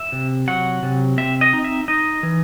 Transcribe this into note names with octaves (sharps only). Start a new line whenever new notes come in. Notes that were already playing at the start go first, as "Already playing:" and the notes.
Already playing: E5
C3
F#3 F#5
C3
C4 E5
D#5
D#4
E5
D#4 D#5
E3